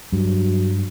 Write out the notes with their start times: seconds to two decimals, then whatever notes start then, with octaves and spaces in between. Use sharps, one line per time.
0.13 G2 F#3